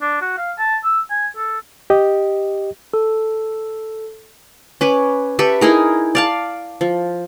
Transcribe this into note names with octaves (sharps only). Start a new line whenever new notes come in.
D4
F#4
F5
A5
E6
G#5
A4
G4 D#5
A4
C#4 B4 D6
G4 A4 B4 E5
D#4 E4 G#4 A#4
D5 F5 A5
F3